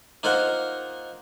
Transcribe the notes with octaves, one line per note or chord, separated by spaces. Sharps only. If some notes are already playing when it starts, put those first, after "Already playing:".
A#3 D#4 F4 A#4 C5 F#5